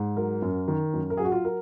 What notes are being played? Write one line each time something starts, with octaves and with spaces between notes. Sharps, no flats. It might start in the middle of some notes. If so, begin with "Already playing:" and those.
Already playing: G#2
F#3 A#4
F#2
D#3
F#2
A#4
F#3 G#4
F#4
F4
A#4